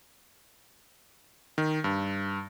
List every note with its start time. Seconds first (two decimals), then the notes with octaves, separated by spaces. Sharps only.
1.58 D#3
1.84 G2